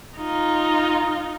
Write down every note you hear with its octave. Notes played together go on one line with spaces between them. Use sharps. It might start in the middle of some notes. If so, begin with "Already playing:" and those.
D#4 F4